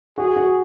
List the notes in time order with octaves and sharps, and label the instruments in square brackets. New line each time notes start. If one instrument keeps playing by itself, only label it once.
[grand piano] F#4 [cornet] G#4
[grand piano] F#4